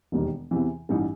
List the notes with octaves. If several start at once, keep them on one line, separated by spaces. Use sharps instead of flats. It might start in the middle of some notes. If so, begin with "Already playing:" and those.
E1 D#2 D#3 G3
E2 C3 E3
A1 G2 E3 G3 D#4